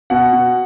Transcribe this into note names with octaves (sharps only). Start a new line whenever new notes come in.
B2 F#5
B2